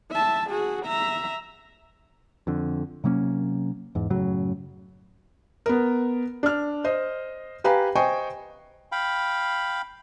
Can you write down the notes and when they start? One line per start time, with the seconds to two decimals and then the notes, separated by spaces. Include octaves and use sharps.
0.11 E5 A5
0.50 F#4 G#4
0.86 E5 A#5
2.47 F2 D3
3.04 C3 F#3 A#3 C#4
3.95 E2 G#2
4.10 F#2 A2 C#3 F#3
5.66 B3 A#4
6.43 D4 F6
6.84 C5 D#5
7.64 G4 B4 F5 G#5 A#5
7.95 C5 D#5 G5 G#5 C#6
8.92 F5 G5 B5